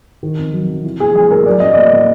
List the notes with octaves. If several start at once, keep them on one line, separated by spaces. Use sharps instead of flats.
D#3
F2
F#3
C3
E3
A#1 G#4
G3 G#4
A2 A#4
F#3 D5
A1 D#5
A#3 D5
A2